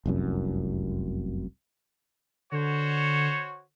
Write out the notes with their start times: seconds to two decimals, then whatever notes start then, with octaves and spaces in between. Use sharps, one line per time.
0.06 F1 C2 F#2
2.52 D3 F#4 C5 C#5